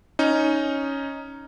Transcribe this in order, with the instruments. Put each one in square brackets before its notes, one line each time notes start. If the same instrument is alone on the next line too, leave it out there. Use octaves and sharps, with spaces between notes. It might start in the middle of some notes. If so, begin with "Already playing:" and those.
[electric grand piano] C#4 D#4